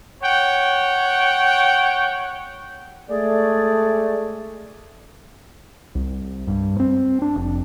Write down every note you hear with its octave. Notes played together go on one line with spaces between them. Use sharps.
C#5 F#5 G5
G#3 A3 G#4 D5
C2
G2
C4
D4
F1